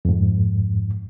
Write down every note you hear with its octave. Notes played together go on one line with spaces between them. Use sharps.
F2 G#2